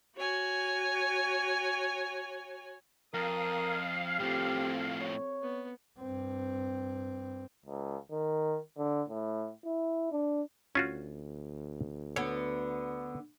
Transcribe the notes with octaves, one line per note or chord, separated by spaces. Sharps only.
F#4 C#5 G#5
F2 A#4 F5 D#6
A2 F3 C4 G4 A4
C#5
B3
G2 C4
C#2
D#3
D3
A2
E4
D4
D2 C#4 F4 F#4
D3 B3 C#5